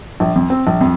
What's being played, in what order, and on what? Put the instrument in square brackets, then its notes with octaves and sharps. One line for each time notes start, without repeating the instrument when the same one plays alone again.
[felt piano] A#1
F2
C4
A#1
F2